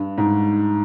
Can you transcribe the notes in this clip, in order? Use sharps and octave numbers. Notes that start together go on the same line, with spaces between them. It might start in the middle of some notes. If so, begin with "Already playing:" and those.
Already playing: G2
G#2